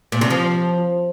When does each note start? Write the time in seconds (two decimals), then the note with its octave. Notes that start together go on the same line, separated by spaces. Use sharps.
0.12 A#2
0.21 C3
0.30 F3